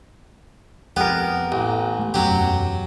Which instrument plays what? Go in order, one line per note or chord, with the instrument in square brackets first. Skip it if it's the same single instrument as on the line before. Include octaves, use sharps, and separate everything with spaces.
[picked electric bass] F2 [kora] B3 A#4 [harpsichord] G4
[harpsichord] A1
[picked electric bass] A3
[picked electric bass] E1 F#2 C#4 [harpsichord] F#3 G4